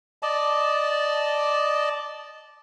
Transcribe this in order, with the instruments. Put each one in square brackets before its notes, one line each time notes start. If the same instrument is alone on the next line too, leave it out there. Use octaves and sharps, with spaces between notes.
[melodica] D5 D#5 A5